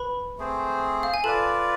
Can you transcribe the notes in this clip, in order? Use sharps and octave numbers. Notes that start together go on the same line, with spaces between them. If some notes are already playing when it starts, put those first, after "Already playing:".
Already playing: B4 B5
A3 C4 G#4 C5
F5
G#5
F4 A4 B4 D5 A5